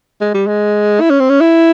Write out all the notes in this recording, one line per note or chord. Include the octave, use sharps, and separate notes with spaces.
G#3
G3
G#3
E4
C#4
C4
C#4
E4